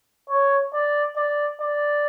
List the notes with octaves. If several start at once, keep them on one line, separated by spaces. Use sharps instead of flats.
C#5
D5
D5
D5